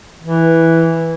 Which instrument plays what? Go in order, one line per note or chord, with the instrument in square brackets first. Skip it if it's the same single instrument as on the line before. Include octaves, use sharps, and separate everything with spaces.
[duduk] E3